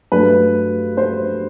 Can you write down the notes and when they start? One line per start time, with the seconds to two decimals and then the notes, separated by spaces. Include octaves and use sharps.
0.12 G2 F#3 A3 B4
0.97 C5